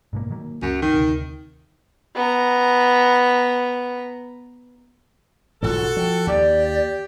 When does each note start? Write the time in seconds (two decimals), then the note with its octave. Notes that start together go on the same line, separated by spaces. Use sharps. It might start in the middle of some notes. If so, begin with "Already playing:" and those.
0.13 G#2 B2 A#3
0.30 D#3 F#3 A#3
0.62 C#2 F#2
0.82 D#3
0.94 D2 C3
2.15 B3 A#5
5.63 B1 G#2 E3 F4 F#4 A4
5.97 F3 G5
6.27 D#2 G4 D5